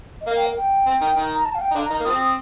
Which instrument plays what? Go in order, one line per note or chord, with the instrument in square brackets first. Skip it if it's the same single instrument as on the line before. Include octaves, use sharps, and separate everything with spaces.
[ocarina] D#5
[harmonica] A#3 [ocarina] F5
[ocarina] G5
A#4
G5
[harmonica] C4
D#3 D#4
D#3 D#4
[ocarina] A#5
A5
F5
G5
[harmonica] D#4
[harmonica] D3 D4 [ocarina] F5
[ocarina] A#5
[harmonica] D#3 D#4
A#3
[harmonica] F3 C4 [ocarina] D#6
[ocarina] D#6